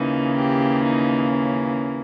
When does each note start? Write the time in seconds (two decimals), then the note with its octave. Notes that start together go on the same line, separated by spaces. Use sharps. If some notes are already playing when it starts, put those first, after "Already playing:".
Already playing: D#2 C#3 E3 A#3 D#4
0.37 G4
0.84 D#4
1.31 C#4